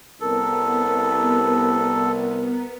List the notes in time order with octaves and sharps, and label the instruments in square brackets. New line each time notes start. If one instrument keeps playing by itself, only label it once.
[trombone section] C2 [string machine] B3 [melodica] A4 [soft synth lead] A#4